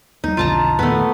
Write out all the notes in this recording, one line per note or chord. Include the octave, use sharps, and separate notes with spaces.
D#2 G3 D#4
B1 F2 D3 F4 A5 A#5
E2 A#2 D#3 A3 B3